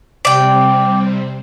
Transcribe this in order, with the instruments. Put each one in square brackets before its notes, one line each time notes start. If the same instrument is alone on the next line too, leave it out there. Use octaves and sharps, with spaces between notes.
[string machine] C3 G3 C4 [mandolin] D5 G5